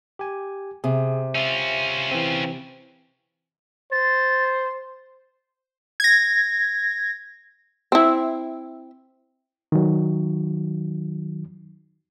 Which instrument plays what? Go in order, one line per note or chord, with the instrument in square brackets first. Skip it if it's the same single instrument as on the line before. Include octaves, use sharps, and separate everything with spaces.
[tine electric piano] G4 G#5
[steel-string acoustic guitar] C3 [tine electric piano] G#4
[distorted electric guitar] C#4 F4 [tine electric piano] E5
[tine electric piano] E3 C4
[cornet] C5 [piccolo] A6
[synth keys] G#6 A#6
[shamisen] C4 E4
[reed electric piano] D#3 F#3